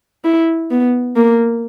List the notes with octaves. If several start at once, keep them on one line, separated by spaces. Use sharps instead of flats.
E4
B3
A#3